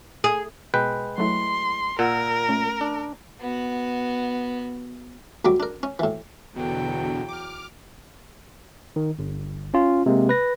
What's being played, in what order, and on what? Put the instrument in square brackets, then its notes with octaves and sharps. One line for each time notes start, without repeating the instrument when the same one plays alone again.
[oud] G#4
[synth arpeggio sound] B2 [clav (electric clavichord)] G#3 B4 G5
[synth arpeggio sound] F#3 A3 E4 [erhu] C6
[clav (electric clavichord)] A#2 [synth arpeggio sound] F4 F#5 E6 [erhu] A#4
[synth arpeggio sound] A3 C#4
[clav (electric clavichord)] D4
[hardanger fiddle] B3 F#4
[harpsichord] D2 F#3 G3 D6
D4 A#4
C#4
A2 E3
[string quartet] E2 F#3 G5 [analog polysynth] B2 D3
[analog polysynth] D6 F6
[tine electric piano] D#3
G1
C#4 F4
C3 G#3 A#3
B4 A#6